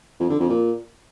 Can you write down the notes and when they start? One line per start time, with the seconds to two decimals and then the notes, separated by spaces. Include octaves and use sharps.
0.20 F2
0.30 D3
0.40 F2
0.49 A#2